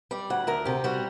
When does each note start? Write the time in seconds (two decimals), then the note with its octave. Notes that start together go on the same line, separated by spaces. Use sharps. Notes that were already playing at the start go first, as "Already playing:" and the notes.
0.11 G3 D5
0.30 D2 F#5
0.47 D2 A#4
0.65 C3 G4
0.84 G3 F#4